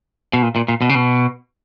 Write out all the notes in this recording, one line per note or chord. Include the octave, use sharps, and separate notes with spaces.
B2
A#2
A#2
A#2
B2
C#3
B2